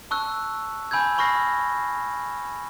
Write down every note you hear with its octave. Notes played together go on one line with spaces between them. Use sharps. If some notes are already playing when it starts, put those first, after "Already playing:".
A5 C#6 E6 F#6
G#5 B5 E6 G6 G#6
B5 C#6 F6 A#6 C7